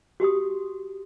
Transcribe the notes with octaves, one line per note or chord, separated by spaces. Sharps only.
F#4 G4 C6 D#6